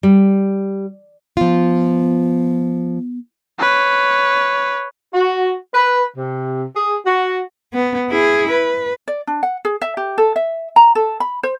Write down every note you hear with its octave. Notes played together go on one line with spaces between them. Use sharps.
G3
F3 B3 F4
B4 C#5
F#4
B4
C3
G#4
F#4
B3
E4 G#4
B4
D5
D4
F#5
G#4
E5
G4
A4
E5
A#5
A4
B5
C5